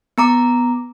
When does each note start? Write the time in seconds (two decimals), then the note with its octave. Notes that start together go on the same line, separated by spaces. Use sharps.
0.18 B3 A#5 D6